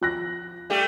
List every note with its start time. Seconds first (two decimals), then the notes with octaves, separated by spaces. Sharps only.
0.01 F3 F#6 A#6
0.70 G3 A3 G4